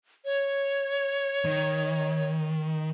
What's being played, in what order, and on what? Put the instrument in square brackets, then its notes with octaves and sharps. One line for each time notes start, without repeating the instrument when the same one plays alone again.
[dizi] C#5
[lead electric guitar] D#3